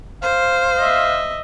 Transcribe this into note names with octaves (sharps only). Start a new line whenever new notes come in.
C5 F5
D#5 E5